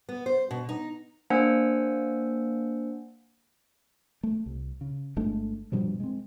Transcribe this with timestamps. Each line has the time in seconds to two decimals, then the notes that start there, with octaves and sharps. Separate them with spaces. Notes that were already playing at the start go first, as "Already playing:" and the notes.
0.09 B3
0.26 C5
0.51 B2
0.69 D#4
1.30 A#3 D4 C5 F#5 G#5 E6
4.23 A3
4.46 C2
4.81 C#3
5.16 G1 G#3 A3 D4
5.72 G2 B2 F3 G3
6.00 G#3 C4